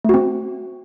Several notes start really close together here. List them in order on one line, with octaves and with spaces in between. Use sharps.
A3 F#4 C4